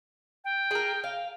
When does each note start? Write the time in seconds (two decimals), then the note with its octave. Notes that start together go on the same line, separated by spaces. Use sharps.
0.44 G5
0.71 G#4 A#4
1.04 F5